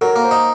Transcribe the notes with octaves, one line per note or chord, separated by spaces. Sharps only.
F#3 A#4
A#3
C5
D#4